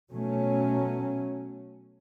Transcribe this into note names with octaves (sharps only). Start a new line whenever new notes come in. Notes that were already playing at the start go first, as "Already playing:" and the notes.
B2 F#3 A3 C#4